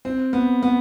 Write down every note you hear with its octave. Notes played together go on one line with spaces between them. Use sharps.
C4
B3
B3